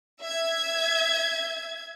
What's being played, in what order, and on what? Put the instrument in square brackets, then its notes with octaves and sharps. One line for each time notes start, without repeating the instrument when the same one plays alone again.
[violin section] E5 G#6